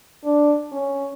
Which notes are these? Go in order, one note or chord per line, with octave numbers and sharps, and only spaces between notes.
D4
C#4